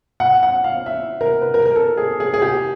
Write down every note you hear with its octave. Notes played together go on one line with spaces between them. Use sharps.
F#5
F#5
F5
E5
A#4
B4
A#4
A#4
A4
G#4
G#4
G#4
G4